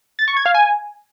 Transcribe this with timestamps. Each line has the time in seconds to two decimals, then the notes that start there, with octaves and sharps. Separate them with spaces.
0.19 A6
0.28 C#6
0.37 G#6
0.46 F5
0.54 G#5